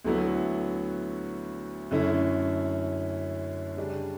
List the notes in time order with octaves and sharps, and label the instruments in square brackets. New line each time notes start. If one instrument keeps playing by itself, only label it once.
[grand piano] D2 D3 F#3 B3 E4
F#2 D3 A3 C#4 E4
C#3 G3 D4